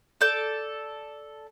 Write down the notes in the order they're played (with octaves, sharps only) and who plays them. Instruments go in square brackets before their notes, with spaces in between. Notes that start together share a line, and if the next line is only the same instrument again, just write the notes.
[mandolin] A4 D5 G6